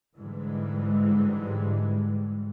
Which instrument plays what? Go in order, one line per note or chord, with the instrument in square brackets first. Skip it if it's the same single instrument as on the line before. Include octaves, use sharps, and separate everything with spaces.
[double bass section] G#2 D3 E3 G3 G#3